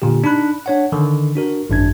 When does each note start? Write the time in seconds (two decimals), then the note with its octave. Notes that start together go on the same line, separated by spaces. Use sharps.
0.02 A#2 D3 G4
0.24 D4 D#4 B5 F#6
0.66 D4 C#5 F#5
0.92 D3 D#3
1.36 D4 F#4 A#4
1.70 G#1 F#2 D4 G#6